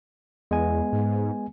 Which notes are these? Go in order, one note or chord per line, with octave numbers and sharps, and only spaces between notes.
E2 G#3 B3 G#5
G#2